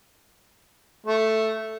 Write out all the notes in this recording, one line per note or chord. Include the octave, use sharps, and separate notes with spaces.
A3